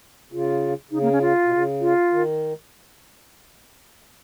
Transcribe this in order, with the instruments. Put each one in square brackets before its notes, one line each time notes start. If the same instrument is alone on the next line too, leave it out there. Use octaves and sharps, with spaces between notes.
[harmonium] C#3 [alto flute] F4
[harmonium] C#3 [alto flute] D#4
[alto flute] A#3
C#4
F4
[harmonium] B2
C#3
[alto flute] F4
[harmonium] D#3